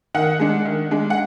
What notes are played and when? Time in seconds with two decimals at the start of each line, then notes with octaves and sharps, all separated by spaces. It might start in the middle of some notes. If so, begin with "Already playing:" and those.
0.14 D#3 F#5
0.40 G#3 D4
0.65 D#3
0.91 G#3 D4
1.10 F#5